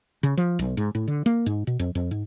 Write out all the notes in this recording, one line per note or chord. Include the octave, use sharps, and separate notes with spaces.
C#3
F3
B1
G#2
A2
D3
A#3
G#2
B2
F2
F2
G#2